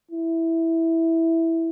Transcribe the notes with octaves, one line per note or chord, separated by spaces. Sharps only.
E4